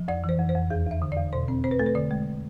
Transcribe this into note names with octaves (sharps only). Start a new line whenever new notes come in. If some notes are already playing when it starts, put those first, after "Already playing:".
Already playing: F3
F2 D5
E3
C5
F2
C5
F2
E2 G#4
E2 E5
D3
D5
E2
B2 C5
C4
C4 C5
B4
A3 A4
B4
D3 D5
G#3